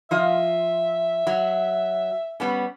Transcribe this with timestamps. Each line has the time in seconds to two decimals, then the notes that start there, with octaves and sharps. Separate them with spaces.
0.11 F3 F4 D#5 E5
1.27 F#3
2.40 G3 B3 C#4